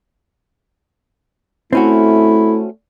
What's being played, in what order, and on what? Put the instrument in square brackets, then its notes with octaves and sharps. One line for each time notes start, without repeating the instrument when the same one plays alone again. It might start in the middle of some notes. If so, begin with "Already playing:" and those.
[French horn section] A3 [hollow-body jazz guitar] C4 C#4 F#4 [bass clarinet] E4